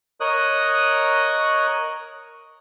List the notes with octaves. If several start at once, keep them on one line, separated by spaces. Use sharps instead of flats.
A#4 C#5 D#5 D#6 F#6